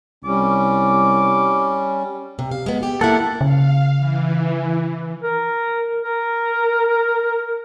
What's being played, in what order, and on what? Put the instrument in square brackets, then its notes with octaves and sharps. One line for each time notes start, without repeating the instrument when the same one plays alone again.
[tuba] C2 [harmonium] G3 C#4 [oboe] D6
[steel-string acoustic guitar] C3
F5
G#3 B3
G4
[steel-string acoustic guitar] A#3 E4 [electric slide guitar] A4 F#5
[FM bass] C#3 [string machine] F5
[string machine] E3
[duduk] A#4
A#4